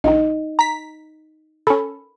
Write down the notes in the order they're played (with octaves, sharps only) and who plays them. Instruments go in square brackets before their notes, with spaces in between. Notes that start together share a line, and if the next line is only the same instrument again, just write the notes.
[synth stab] A#1 D#3 [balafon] D#4 D#5
[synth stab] A#5 B6
[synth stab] C#4 A4 [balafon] B5